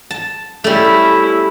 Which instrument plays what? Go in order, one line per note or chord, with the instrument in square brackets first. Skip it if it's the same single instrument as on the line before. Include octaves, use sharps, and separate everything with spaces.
[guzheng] A5
[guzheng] G3 A3 [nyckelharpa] C#4 E4